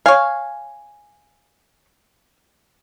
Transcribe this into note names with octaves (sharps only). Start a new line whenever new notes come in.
C#5 F5 G#5